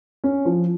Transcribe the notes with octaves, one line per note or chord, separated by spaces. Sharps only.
C#4
F3